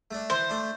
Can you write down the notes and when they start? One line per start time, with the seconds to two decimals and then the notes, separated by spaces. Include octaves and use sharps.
0.11 A3 D4
0.30 E3 C5
0.50 A3 D4